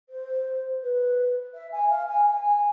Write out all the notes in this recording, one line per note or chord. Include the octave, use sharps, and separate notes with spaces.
C5
B4
E5
G#5
F5
G#5
G#5